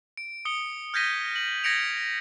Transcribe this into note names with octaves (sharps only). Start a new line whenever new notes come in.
D7
D#6 C#7 G7
F6 G6 G#6 A#6 B6 D#7
F#7
G#6 A#6 B6 C#7 D7 F7